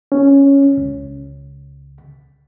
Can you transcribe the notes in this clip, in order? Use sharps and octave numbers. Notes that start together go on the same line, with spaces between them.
C#4
C#2